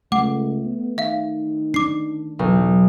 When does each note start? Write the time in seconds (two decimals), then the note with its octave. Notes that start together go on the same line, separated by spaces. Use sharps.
0.12 C#2 A3 F#5 D6
0.65 B3
0.98 D#3 E5 F5
1.74 D4 D6 C7
2.39 B1 E2